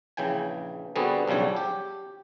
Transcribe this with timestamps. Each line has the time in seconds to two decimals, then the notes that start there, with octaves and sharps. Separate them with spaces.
0.17 A#1 C#3 E3 G5 G#5
0.96 D3 G3 B3 C4 F#4 G#4
1.28 B1 C#3 F3 G3 C#5
1.56 G4